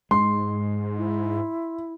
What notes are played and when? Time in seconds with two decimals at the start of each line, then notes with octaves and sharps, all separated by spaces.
0.11 G#2 G#3 C6
0.98 E4